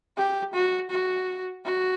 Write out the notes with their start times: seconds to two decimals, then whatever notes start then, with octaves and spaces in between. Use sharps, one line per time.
0.17 G4
0.53 F#4
0.90 F#4
1.65 F#4